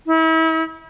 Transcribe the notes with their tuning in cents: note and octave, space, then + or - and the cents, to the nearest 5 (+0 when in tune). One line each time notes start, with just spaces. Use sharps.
E4 -40